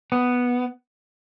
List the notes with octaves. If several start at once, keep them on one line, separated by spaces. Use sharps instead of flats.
B3